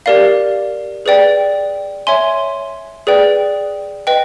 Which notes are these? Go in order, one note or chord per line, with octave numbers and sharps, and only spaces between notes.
G4 A#4 D5 F5
G#4 B4 D5 G5
C#5 E5 G#5 C6
G#4 B4 D5 G5
B4 D#5 G5